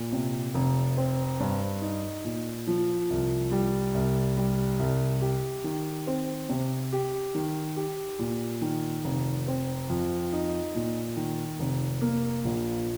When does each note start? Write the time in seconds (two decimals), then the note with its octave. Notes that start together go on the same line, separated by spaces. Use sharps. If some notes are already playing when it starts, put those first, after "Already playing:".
Already playing: A#2
0.13 C3
0.54 F1
0.97 C4
1.40 G2
1.82 D#4
2.25 A#2
2.67 F3
3.10 C2
3.51 G3
3.94 C2
4.37 G3
4.79 C2
5.21 G4
5.64 D#3
6.07 C4
6.49 C3
6.92 G4
7.35 D#3
7.76 G4
8.19 A#2
8.61 D#3
9.04 F1
9.48 C4
9.90 F2
10.33 D#4
10.75 A#2
11.16 D#3
11.59 F1
12.01 A#3
12.45 A#1